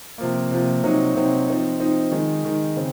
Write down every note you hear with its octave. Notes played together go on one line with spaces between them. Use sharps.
C3 F3 A#3
C3 F3 A#3
C3 F#3 C4 D#4
C3 F#3 C4 D#4
F3 C4 D#4
F3 C4 D#4
D#3 G#3 D#4
D#3 G#3 D#4
C#3 C4